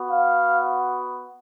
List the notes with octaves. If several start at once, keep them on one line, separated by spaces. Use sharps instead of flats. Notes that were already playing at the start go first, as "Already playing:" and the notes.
Already playing: B3 F#4
F5